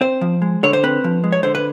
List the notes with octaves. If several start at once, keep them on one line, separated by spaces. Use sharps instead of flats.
C4 C5
F3
G#3
D3 C#5
C5
C4 B4
F3
G#3
C#5
D3 C5
B4